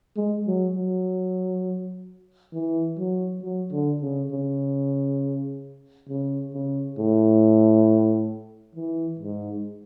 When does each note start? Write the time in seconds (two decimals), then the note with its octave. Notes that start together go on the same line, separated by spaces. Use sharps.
0.17 G#3
0.47 F#3
0.76 F#3
2.54 E3
2.99 F#3
3.43 F#3
3.72 D3
4.02 C#3
4.32 C#3
6.09 C#3
6.54 C#3
6.98 A2
8.76 E3
9.20 G#2